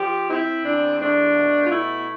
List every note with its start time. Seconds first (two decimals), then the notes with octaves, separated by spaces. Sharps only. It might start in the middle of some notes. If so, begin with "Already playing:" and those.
Already playing: F3 G4
0.28 C4 E4
0.64 E2 D4
0.99 A3 D4
1.34 B2
1.66 F4
1.70 A3 E4